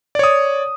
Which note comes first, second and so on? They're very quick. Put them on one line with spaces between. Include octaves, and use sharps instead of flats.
D5 C#5 D#6